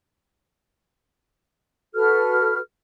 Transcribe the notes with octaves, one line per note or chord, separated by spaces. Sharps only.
F#4 A4 B4 F6